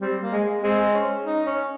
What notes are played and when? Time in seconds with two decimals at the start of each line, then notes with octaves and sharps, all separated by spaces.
0.01 G3 C4
0.22 A#3
0.32 G#3
0.42 G#3
0.63 G#3 C4
0.94 C#4
1.25 D#4
1.46 C#4